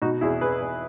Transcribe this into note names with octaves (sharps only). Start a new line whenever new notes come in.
B2 D#4 F#4
E2 E4 G#4
E2 G#4 B4
E2